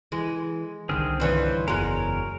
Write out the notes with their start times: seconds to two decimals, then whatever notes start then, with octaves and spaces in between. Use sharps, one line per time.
0.12 E3 G#3
0.89 C2 D3 D#3 C4 G#4 F6
1.20 G2 E3 C5 C#5
1.68 F#1 E2 G#3 F#4 A#4 C#5